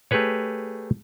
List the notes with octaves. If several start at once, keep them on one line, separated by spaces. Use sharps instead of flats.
A3 G4 G#4 B4 C#5